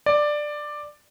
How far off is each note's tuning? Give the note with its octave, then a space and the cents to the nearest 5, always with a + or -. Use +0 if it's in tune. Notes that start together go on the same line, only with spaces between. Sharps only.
D5 +10